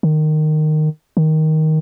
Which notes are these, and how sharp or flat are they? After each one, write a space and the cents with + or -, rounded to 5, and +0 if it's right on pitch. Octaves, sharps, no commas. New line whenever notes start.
D#3 -15
D#3 +10